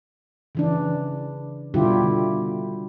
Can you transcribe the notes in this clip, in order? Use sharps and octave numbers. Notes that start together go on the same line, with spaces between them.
C#3 E3 D4
B2 D3 G3 E4 F4 G4